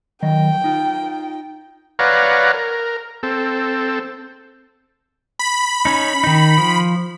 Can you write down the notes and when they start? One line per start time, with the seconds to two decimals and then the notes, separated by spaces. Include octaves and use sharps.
0.23 D#3 F#3 D#5 G5
0.64 D#4 F4
1.99 B4 C#5 D5 F5 F#5 A#5
2.54 A#4
3.23 C4 A4
5.39 B5
5.85 C#4 D#4
6.24 D#3 D#4
6.58 F3